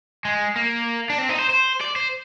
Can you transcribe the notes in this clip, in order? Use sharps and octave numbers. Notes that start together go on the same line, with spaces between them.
G#3
A#3
D4
C4
D#4
C5
C5
D5
C5